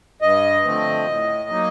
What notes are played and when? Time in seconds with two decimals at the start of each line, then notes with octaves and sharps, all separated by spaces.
0.21 G2 D#5
0.64 D3 F3 A3 C4
1.07 A2
1.50 F#3 A#3 D#4